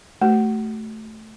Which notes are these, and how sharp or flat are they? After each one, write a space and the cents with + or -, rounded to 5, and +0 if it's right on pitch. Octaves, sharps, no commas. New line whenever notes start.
A3 -5 F#4 +40